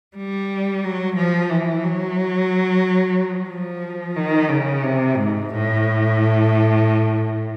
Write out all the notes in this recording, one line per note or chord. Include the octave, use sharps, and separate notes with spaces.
G3
F#3
F3
E3
F#3
F3
D#3
C#3
C3
G#2
A2